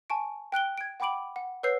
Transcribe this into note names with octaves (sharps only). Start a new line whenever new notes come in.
G#5 A5 C#6 D7
G5 F#6 D7 G7
G#6 D7
F#5 G5 B5 D6 D7 F#7
F#5
B4 C#5 F#5 E6 G6 C7